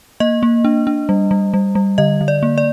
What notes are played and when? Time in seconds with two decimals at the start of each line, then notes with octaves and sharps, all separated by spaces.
0.20 A#3 D#5
0.43 A#3
0.65 D4
0.87 D4
1.09 G3
1.31 G3
1.54 G3
1.75 G3
1.98 D3 D#5
2.21 D3
2.28 D5
2.43 A#3
2.58 D5